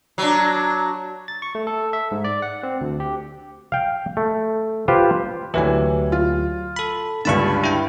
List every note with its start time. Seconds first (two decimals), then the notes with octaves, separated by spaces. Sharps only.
0.18 F#3 D4
1.28 A6
1.42 C#6
1.55 A3
1.67 A4
1.93 E5
2.12 G#2
2.24 D5
2.42 F#5
2.63 C4
2.81 D2
3.00 G4
3.72 F5 G5
4.17 A3
4.88 F4 G4 B4 C5
5.54 D2 E3 F#3 G4 G#5
6.12 F4
6.76 A4 B5
7.25 C#2 G2 D3 A5 B5 C#6
7.64 E4 G5